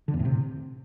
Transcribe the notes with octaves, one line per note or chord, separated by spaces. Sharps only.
D3
E2
A2
C3